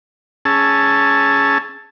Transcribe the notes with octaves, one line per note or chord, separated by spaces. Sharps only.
C#4 G#4 A5 E6